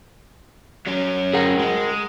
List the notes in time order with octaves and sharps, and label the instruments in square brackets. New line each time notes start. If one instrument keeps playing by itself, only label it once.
[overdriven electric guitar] F#3 C#4
[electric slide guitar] G#4 A#4 F#5
[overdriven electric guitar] G#3